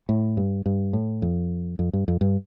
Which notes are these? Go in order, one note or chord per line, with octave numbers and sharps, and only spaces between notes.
A2
G2
G2
A2
F2
F2
G2
F2
G2